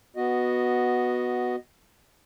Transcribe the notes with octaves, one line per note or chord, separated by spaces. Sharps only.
B3 F#4 D#5